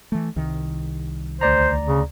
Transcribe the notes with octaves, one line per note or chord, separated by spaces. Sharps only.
E3 A3
C2 D#3
D2 C5 D5 A#5
C#3